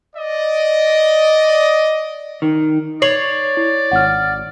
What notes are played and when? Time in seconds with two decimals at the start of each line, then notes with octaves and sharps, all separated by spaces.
0.16 D5 D#5
2.42 D#3
3.02 C#5 D5 C7 F7 F#7
3.57 E4
3.91 G#1 F#5 F6